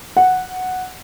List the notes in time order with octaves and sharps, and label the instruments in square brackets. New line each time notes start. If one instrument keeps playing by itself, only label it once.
[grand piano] F#5